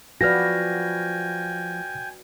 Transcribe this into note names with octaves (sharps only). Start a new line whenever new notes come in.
F3 F#4 B4 D5 G5 G#5 F6 A#6